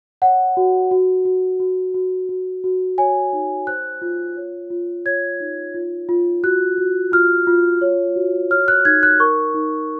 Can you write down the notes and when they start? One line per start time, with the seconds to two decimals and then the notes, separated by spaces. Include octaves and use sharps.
0.22 C#5 F#5
0.57 F#4
0.91 F#4
1.25 F#4
1.60 F#4
1.94 F#4
2.29 F#4
2.64 F#4
2.98 C#5 G#5
3.33 D#4
3.67 C5 F#6
4.02 F4
4.37 C#5
4.71 F4
5.05 C#5 G#6
5.40 D#4
5.74 F4
6.09 F4
6.44 F#4 F#6
6.78 F#4
7.12 F4 F6
7.47 F4
7.81 C#5
8.16 F#4
8.51 C#5 F6
8.68 F#6
8.85 D#4 G#6
9.03 F#6
9.20 A#4 C#6
9.55 D#4